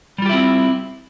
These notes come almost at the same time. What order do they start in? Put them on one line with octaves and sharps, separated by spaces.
G3 F4 G4 E4 C4